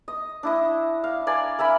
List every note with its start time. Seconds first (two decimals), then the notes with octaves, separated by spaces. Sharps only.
0.08 D#5
0.43 D4 E4 D#5
1.04 F5
1.27 D5 G#5 A#5 C6
1.59 A#4 E5 G#5 B5